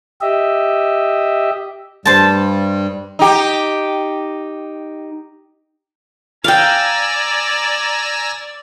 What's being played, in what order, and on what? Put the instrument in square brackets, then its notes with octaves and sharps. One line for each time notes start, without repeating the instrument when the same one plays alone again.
[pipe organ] G4 D#5 E5
[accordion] G2 G3 [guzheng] C5 A5
[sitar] D#4 G4
[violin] D5 [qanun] F5 G5 [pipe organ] G#5 A#5 E6